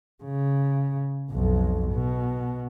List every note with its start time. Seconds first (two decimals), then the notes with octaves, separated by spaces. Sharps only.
0.24 C#3
1.31 B1 F2
1.92 B2